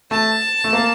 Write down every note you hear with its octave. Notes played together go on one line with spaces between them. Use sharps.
A3 A5
A3
A#3